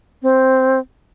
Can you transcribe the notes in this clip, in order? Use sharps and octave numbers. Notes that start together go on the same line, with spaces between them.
C4